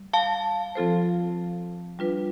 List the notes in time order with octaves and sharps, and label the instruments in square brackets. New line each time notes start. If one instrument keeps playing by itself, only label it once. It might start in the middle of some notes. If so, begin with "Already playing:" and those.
Already playing: [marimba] G3
[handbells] F5 A5
[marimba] F3 C4 F4 A4 C5
G3 D4 F4 B4